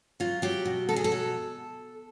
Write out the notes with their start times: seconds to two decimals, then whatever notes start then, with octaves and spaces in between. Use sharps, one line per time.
0.20 F#3 F4
0.42 F#3 G4
0.65 B2
0.89 B2 A4
0.96 G#4
1.04 A4
1.12 F#3